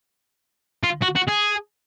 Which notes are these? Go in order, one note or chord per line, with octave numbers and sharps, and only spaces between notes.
F4
F#4
F#4
G#4